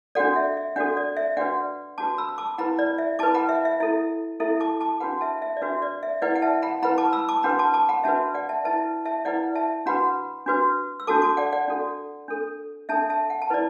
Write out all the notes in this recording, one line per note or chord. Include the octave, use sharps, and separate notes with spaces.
D4 F#4 A4 D5 F#5
E5
E5
D4 F#4 A4 D5 F#5
D5
E5
D4 F#4 B4 D5 F#5
D4 F#4 B4 A5 D6
B5 E6
E6
A5 D6
E4 B4 F#5 B5
D5
E5
E4 B4 A5 D6
F#5 B5
E5
E5
E4 A4 E5
E4 A4 E5
A5 D6
A5 D6
D4 F#4 B4 F#5 B5
E5 A5
E5
D5
D4 F#4 B4 E5
D5
E5
E4 B4 D5 F#5
F#5
E5 A5
F#5 B5
E4 B4 F#5 B5
A5 D6
B5 E6
A5 D6
D4 F#4 B4 F#5 B5
A5 D6
A5 D6
F#5 B5
D4 F#4 B4 E5 A5
D5 F#5
E5 A5
E4 B4 E5 A5
E5 A5
E4 B4 D5 F#5
E5 A5
D4 F#4 B4 F#5 B5
D4 F#4 B4
E6
D4 F#4 A4 A5 D6
A5 D6
D5 F#5
D5 F#5
D4 F#4 A4
D4 A4
D4 A4 E5 A5
E5 A5
F#5
A5
E4 B4 D5